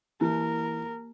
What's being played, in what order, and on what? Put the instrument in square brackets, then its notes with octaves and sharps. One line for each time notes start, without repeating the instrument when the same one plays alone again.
[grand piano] E3 [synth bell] A#3 [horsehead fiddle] A#4